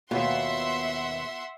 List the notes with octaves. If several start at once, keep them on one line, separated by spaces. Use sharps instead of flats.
D#2 G#2 B2 B3 F4 E5 F#5 C6